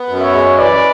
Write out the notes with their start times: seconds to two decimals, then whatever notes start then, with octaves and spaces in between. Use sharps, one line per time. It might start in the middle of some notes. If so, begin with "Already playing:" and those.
Already playing: B3
0.09 F#2
0.20 C#5 E5
0.33 G#3
0.56 E3 B4 D5